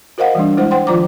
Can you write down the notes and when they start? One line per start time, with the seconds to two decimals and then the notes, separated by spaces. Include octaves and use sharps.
0.18 F#4 A#4 C5 D#5 F5 F#5
0.35 E3 G3 D4
0.57 G#3 E4 C5 F#5
0.71 C5 F#5 G5 C6
0.87 D#3 F3 F4 C5 A#5 D6